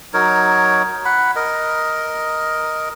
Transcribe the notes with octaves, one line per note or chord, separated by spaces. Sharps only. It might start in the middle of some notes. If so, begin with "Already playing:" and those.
F#3 D#4 A#4 C#5
F#5 B5
A#4 D#5